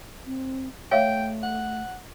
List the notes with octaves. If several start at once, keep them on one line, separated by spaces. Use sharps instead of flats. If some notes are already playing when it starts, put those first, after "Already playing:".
C4
A3 C#5 E5 F5 G5
F#5